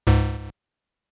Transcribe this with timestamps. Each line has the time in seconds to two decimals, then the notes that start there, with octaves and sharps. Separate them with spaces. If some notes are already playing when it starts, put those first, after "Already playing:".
0.07 C#2 G#2